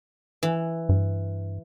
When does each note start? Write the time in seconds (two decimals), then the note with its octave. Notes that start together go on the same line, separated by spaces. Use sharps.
0.43 E3
0.89 G2